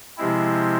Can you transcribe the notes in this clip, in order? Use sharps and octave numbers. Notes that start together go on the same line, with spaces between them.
C3 F3 G#3 C4 E4